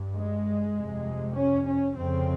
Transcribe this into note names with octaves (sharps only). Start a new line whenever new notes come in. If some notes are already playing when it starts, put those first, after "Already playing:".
Already playing: G2
G#3
F2 C3
C#4
C#4
F2 C#3 C4